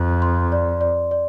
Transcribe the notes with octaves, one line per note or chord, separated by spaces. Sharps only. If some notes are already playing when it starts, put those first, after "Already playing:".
Already playing: F2
C6
D5
D5
D5